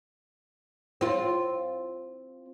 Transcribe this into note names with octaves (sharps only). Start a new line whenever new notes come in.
C4 F4